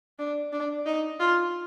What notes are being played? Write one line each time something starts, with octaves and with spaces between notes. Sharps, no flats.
D4
D4
D#4
F4